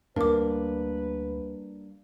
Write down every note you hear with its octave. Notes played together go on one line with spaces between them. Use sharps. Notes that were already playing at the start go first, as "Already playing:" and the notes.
D2 G3 A#3 D4 A#4 B4 D6